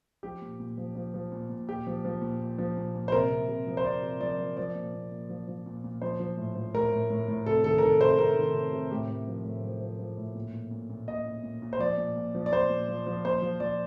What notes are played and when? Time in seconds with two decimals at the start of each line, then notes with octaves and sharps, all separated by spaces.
0.23 F3 G4
0.41 A#2
0.59 A#2
0.78 F3
0.95 F3
1.14 F3
1.32 A#2
1.49 A#2
1.67 A#2 G4
1.87 F3
2.05 F3
2.22 A#2
2.40 A#2
2.58 F3
2.77 A#2
2.94 A#2
3.08 C5
3.12 C3 A#4
3.31 C3
3.48 C3
3.67 F3
3.77 C5
3.84 C3 D5
4.03 C3
4.20 F3 D5
4.38 F3
4.57 F3 D5
4.75 A#2
4.94 A#2
5.11 A#2
5.29 F3
5.48 F3
5.66 A#2
5.84 A#2
6.01 F3 C5
6.20 F3
6.37 A2
6.56 F3
6.74 A2 A#4
6.92 A2
7.10 A2
7.28 A2
7.46 C3 A4
7.64 D#3 A4
7.78 A#4
7.82 D#3 A4
8.00 C3 C5
8.19 C3 A#4
8.36 D#3
8.54 C3
8.73 C3
8.91 A2 G4
9.09 A2
9.28 F3
9.45 A2
9.63 F3
9.81 F3
9.99 F3
10.17 A2
10.35 A#2
10.54 A#2
10.71 A#2
10.90 A#2
11.07 A#2 D#5
11.25 A#2
11.43 A#2
11.62 A#2
11.73 C5
11.79 F3 D5
11.97 A#2
12.16 A#2
12.35 F3
12.46 D5
12.52 A#2 C5
12.70 A#2
12.88 F3
13.07 F3
13.25 A#2 C5
13.42 F3
13.60 F3 D5